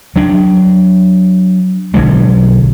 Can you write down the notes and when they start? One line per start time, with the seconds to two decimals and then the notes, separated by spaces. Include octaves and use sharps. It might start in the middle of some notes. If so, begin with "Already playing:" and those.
0.16 F#3 D4
1.94 B1 D3 F#3 G#3